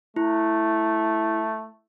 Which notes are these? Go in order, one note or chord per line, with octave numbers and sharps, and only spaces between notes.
A3 E4